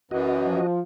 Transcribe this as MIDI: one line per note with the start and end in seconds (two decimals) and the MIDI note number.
0.11 0.59 42
0.11 0.59 52
0.11 0.67 66
0.11 0.67 75
0.47 0.79 53